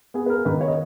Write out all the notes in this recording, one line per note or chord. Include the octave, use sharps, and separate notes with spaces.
B3 G#4
B4
A#4
D#3 B4
C#5
D#5